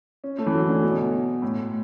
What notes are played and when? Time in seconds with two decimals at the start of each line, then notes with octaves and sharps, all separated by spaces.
0.24 C#4
0.38 A3
0.46 E3
0.54 F#3
0.69 D3
0.83 B2
1.42 A2